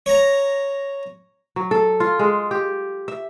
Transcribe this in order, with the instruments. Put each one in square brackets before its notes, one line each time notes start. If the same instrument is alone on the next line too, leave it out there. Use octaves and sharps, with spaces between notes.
[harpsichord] C#5 A#5
[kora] F#3
A4
F4
G#3
G4
E5